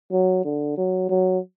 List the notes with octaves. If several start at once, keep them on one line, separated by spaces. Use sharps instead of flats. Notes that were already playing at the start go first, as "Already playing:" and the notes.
F#3
D3
F#3
F#3